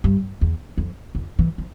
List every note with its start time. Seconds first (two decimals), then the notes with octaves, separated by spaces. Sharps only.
0.04 G2
0.41 E2
0.77 F2
1.15 F2
1.39 E3
1.58 F3